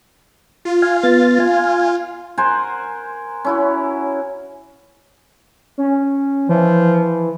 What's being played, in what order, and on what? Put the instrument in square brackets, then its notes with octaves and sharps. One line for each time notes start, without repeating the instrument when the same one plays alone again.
[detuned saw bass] F4
[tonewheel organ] F5 G#5
B3 A6
F5 G#5
[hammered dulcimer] A#4 C5 F#5 G#5
C#4 E4 F#4
[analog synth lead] C#4
[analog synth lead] E3 [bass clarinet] F3